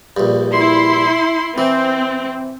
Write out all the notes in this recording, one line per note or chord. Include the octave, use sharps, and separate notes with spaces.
A#1 G2
E4 C6
E3 C4